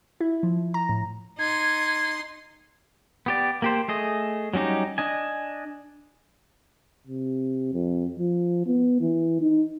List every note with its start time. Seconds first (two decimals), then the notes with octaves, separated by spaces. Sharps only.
0.21 E4
0.43 F3
0.74 A#5
0.89 A2
1.38 D#4 C6 G#6
3.26 B3 G4 D5
3.62 A#3 G4 C5
3.88 A3 G#4 D#5
4.54 F#3 G3 C#4 D#4 G4
4.98 D4 D#5 G#5
7.07 C3
7.74 F2
8.18 F3
8.67 B3
9.01 E3
9.41 D#4